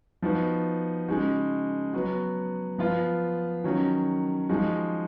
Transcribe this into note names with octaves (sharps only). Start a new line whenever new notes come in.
F3 B3 D#4 F#4
C#3 G#3 D#4 F#4
F#3 B3 F#4
F3 B3 F4
D#3 F#3 C#4 F#4
F3 G#3 D#4 F#4